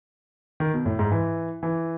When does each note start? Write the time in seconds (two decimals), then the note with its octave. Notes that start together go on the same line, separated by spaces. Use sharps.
0.60 D#3
0.74 B2
0.86 A2
0.99 G#2
1.12 E3
1.63 E3